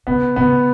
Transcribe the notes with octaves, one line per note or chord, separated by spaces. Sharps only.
C#3 B3
C#3 B3